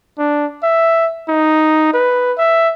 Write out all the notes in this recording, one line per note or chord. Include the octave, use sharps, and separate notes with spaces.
D4
E5
D#4
B4
E5